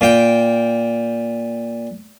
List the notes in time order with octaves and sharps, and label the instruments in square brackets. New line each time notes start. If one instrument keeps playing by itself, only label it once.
[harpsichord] A#2 G5